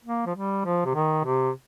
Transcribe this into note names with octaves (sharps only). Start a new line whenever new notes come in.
A#3
F3
G3
F3
C3
D#3
C3